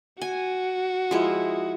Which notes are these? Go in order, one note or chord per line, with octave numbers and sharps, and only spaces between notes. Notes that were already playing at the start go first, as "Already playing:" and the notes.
F#4 G#5
F3 G#3 E4